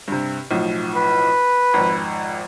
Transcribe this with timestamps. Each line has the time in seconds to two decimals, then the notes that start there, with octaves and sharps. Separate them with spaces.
0.08 G2 C3
0.51 B1 A2 F3
0.95 B4
1.74 G#1 F2